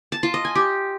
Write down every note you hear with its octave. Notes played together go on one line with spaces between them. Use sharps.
A5
F4
D#5
G#5
G4